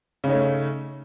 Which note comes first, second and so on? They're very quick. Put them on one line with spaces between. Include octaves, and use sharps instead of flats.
C#3 D#4 C#4 A3